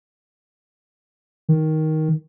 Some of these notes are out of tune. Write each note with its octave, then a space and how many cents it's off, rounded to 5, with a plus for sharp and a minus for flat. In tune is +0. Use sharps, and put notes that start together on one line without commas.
D#3 +10